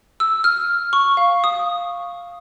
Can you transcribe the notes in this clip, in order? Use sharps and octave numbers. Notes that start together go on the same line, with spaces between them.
E6
F6
C#6
F5
D#6